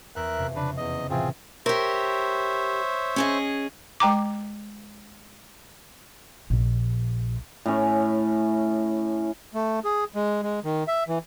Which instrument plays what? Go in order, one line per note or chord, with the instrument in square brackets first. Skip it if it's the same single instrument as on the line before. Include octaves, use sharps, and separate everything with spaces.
[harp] E2 [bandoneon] A#4 E5 F#6
[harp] F2 C3
[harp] C#3 [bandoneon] D4 B4
[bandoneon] E2 D#5
[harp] A2 C3 E3 [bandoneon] C4 F4 G#4
[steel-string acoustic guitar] G4 A#4 [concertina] C5 C#5 E5
[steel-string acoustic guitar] C#4 G#4 D#5
[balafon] G#3 G5 A#5 D6
[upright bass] A#1
[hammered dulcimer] A2 C#4
[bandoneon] A3
G#4
G#3
G#3
D#3
E5
E3